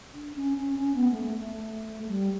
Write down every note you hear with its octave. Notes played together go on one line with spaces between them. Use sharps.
D4
C#4
C#4
C#4
B3
A3
A3
G3